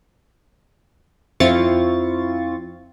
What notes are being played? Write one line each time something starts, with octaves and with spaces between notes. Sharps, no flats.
F2 C4 E4 F4 C#6 A6